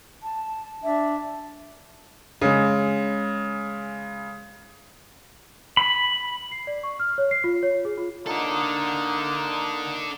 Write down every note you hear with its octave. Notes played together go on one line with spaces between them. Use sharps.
A5
D4 E5
C#3 G#3
B5
C7
D5
C#6
F6
C#5
C7
F4
C#5
G#4
F4
D3 A#3 D4 D#4 A4